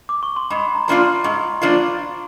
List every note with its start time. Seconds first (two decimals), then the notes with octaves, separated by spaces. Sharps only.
0.09 D6
0.23 C#6
0.36 C6
0.50 G#2 B5
0.75 A#5
0.88 F3 A#3 D4 F4
1.00 C6
1.24 G#2 C#6
1.62 F3 A#3 D4 F4